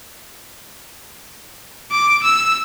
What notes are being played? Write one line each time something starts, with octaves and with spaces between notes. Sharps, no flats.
D6
E6